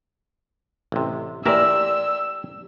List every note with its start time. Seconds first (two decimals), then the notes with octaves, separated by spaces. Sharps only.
0.92 A1 C3
1.45 E3 G4 A#4 C5 D5 E5 E6